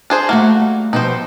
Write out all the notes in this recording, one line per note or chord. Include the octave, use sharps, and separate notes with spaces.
D4 G#4 C5
A3 A#3 F#4 F#5
G3
B2 F3 D#4 G4 C5